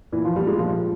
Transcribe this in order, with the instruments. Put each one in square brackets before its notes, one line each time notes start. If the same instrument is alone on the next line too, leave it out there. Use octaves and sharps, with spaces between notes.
[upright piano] A#2 E3
F3
A#2 G3
G#3
A#2 F3